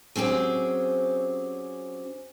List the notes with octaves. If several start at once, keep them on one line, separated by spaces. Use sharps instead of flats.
F#3 C4 C#4 G4 G#4